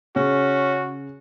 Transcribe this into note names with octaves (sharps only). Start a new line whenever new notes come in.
C#3 C#4 F#4